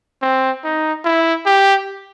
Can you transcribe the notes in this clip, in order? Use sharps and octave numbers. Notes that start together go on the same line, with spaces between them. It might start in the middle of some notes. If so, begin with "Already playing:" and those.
C4
D#4
E4
G4